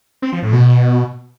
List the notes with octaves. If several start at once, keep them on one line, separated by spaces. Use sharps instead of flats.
C4
F3
A2
B2